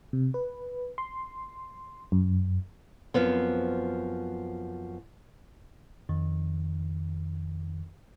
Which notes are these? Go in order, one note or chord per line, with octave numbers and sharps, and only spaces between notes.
C3
B4
C6
F#2
F#2 F3 B3 C4
F2 D#3